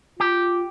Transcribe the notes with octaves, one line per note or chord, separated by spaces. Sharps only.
F4 G4